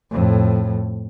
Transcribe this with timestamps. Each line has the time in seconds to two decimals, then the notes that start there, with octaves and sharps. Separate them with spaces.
0.11 F2 A2